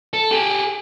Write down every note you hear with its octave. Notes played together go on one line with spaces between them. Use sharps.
A4
G4 G#4